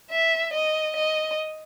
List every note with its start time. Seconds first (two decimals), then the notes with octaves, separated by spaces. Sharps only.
0.11 E5
0.53 D#5
0.96 D#5